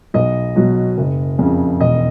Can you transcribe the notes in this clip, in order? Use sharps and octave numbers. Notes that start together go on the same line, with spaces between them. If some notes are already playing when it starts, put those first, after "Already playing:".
B1 D#5
B2 F#3
F#1
F2 C#3
E1 D#5